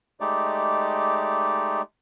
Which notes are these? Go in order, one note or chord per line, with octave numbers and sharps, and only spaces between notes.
G#3 A3 D#4 G4 D5